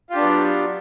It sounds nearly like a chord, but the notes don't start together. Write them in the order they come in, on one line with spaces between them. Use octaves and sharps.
F4 G4 D4 B3 F#3